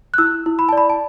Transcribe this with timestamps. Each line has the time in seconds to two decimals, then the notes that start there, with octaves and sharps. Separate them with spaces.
0.14 F#6
0.18 E4 E6
0.46 E4
0.59 B5
0.69 D5 A5
0.77 B5
0.90 A5